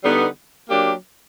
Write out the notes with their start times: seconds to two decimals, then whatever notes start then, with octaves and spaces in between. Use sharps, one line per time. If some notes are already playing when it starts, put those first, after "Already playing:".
0.02 D3 G3 B3 D#4
0.69 F#3 A#3 D4 G4